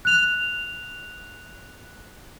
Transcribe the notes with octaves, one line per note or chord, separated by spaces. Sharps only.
F#6 F7